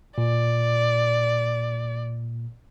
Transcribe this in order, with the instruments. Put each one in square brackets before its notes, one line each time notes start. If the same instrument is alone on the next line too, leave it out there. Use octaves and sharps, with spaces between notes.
[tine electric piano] A#2 [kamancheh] D5